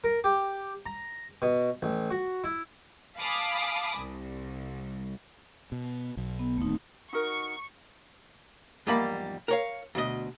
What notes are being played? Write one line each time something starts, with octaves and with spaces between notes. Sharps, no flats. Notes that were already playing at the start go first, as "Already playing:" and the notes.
A#4
G4
A#5
B2
A1
F#4
E4
F5 G#5 A5 B5 D6 D#6
C2
B2
B1
B3
D1 D#2 A3 C4 D#4
D#4 F#4 A#4 C#6
E2 G#2 F3 G3 A#3 B5
A#4 C#5 F5
D2 B2 D#5